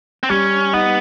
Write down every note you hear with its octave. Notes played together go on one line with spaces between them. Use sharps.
C4
G3 C#4
B3 D#4